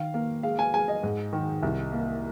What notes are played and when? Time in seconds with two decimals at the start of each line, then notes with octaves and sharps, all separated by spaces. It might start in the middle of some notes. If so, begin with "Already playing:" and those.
Already playing: D#3 F5
0.14 A#3
0.43 G#3 F5
0.59 G#5
0.73 G#3 G#5
0.88 D#5
1.03 G#2
1.33 D#3
1.63 C2
1.93 A#3